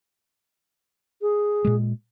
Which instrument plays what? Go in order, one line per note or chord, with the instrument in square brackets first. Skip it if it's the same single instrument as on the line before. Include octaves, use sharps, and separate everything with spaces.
[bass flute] G#4
[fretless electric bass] A#2 G#3